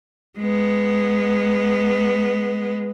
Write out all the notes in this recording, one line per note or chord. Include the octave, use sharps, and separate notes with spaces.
G#3 B3